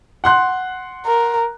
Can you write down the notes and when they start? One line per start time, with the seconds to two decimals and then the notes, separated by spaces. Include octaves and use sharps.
0.24 F#5 C6 F#6
1.06 A#4